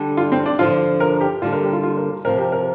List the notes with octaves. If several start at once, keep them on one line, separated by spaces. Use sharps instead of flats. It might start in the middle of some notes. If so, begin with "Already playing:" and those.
Already playing: D3 G3 D4
F4
C4
D4
D3 F3 D4 F4
A#4
G4
D3 G3 A#3 D4 F4
A#4
G4
F4
F4
A#4
C3 F3 C4 A#4
G4
A#4